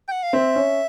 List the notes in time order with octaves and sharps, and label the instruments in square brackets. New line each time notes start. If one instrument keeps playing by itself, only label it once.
[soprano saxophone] G5
F#5
F5
[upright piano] C4 [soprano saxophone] E5
[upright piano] C#4